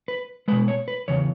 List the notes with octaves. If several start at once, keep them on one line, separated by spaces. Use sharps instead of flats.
B4
B2 G#3 B4
C#5
B4
E2 C#3 C#5